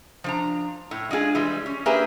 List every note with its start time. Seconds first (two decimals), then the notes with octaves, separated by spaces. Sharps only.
0.24 F3 D4 A#5
0.91 A2
1.11 G#3 D4 F4 G#4
1.35 E3 G3 G#3
1.66 C#4
1.86 A#3 D4 G4 G#4 B4 E5